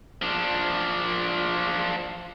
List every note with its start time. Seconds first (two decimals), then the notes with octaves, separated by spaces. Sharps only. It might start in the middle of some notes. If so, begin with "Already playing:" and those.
0.22 F3 D4